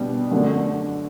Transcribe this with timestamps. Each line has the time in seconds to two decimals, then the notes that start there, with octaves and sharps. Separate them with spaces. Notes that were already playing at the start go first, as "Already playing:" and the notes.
Already playing: B2 G3 B3 D4
0.31 F#2 D3 A3 D4 F#4